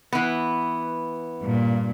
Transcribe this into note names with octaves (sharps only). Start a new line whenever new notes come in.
E3 B3
G2 A#2